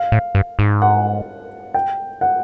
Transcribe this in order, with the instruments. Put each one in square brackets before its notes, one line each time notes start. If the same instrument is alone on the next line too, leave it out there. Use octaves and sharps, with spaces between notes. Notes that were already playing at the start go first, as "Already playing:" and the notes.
Already playing: [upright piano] F5
[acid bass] A2
G2
G#2
[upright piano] F#5
G5
F#5